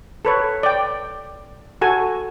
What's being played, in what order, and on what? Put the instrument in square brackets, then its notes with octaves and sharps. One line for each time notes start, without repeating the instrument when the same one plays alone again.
[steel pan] A4 B4 C#5
D5 G5
F#4 A4 G#5